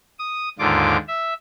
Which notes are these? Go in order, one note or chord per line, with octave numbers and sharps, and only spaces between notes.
D#6
D#2 G#2 D3 F4 D6
E5